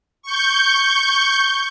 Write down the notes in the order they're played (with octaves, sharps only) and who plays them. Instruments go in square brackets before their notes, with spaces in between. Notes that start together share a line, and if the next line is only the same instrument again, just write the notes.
[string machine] C#6 G6